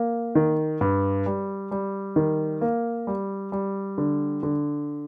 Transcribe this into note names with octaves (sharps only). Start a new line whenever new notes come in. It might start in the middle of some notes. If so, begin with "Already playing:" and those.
Already playing: A#3
D#3
G2
G3
G3
D#3
A#3
G3
G3
D3
D3